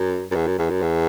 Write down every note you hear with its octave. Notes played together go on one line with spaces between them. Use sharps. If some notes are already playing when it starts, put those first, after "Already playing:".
Already playing: F#2
F#2
E2
F#2
E2
F#2
E2